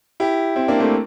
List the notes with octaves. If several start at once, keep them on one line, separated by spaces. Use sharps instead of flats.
E4 G4
C4 E4
A#3 D4
A3 C4